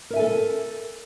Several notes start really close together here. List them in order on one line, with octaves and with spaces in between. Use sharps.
A#4 E5 G#5 A4